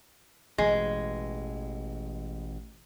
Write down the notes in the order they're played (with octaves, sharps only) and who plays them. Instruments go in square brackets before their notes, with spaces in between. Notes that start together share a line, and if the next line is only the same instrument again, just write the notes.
[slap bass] A1 B2 E3 [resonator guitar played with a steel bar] G#3